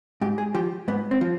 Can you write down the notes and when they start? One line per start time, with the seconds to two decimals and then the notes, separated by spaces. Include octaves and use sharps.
0.21 G#2 G4
0.38 G#4
0.54 F3 G4
0.88 G#2 B3
1.11 C4
1.21 F3